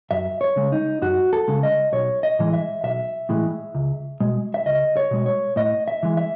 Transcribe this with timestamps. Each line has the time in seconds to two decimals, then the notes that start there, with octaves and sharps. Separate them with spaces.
0.11 F#2 E5
0.41 C#5
0.56 C#3 G#3
0.72 D#4
1.02 F#2 F#4
1.33 A4
1.48 C#3 G#3
1.63 D#5
1.92 B1 C#5
2.23 D#5
2.39 A2 E3 G#3
2.53 E5
2.84 B1 E5
3.29 A2 E3 G#3
3.75 C#2
4.21 B2 G#3
4.54 E5
4.66 C#2 D#5
4.97 C#5
5.11 B2 G#3
5.26 C#5
5.56 A2 D#5
5.88 E5
6.03 E3 G#3
6.17 E5